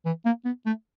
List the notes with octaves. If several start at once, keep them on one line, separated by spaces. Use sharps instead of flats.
E3
A#3
B3
A3